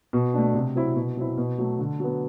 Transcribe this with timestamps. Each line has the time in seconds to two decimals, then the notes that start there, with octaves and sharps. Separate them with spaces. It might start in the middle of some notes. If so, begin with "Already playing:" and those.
0.13 B2
0.34 A3 D4
0.54 C3
0.75 F#3 C4 E4
0.96 B2
1.17 F#3 C4 E4
1.38 B2
1.58 F#3 A3
1.79 D3
2.00 F#3 B3